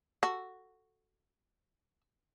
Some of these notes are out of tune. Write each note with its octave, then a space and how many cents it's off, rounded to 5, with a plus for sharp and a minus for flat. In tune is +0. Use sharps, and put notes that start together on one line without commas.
F#4 +0 A4 +0